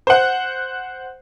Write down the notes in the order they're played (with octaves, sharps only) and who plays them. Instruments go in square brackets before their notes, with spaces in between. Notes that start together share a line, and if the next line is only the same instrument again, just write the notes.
[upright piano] C5 F#5